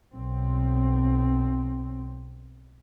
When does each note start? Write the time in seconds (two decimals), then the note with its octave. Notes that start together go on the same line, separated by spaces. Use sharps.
0.14 B1 C4